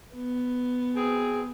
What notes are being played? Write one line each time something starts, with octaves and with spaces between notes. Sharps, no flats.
B3
B2 C4 G#4